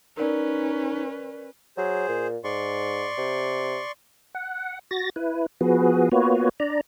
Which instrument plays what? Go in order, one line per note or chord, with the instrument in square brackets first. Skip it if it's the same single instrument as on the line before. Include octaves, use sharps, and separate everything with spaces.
[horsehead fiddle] C#4 B4 [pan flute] D#4 [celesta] A#4 D5
[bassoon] F#3 [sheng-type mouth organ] G#4 C5
[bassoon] A#2
[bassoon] G#2 [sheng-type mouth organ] D5 C6 C#6
[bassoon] C3
[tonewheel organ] F#5
F#4 A6 A#6
E4 B4
F3 B3 F#4 G#4 B4
A#3 B3 F4 F#4 B4 C#5
D4 D5 A#5